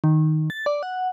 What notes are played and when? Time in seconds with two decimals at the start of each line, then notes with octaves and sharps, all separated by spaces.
0.04 D#3
0.50 A6
0.66 D5
0.83 F#5